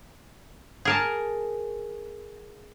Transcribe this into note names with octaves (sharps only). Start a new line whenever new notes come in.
G#4 A#4 A5